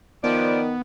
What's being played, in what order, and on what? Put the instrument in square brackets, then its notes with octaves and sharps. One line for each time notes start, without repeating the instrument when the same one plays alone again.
[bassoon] D#3 [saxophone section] F3 D5 [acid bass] B3